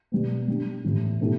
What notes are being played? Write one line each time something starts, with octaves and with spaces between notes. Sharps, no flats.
B2 G3 B3
G3 D4 G4
A2 E3 G3 E4
B2 A3 E4 G4